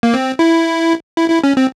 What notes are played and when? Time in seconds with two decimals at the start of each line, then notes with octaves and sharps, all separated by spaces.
0.03 A#3
0.14 C4
0.39 E4
1.17 E4
1.30 E4
1.44 C#4
1.57 C4